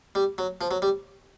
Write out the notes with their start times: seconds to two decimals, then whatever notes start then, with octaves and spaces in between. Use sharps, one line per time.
0.15 G3
0.38 F#3
0.61 F3
0.71 F#3
0.82 G3